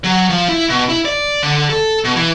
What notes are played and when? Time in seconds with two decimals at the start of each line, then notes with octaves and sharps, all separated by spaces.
0.04 F#3
0.30 F3
0.48 E4
0.69 B2
0.89 E4
1.05 D5
1.43 D3
1.70 A4
2.04 B2
2.16 E3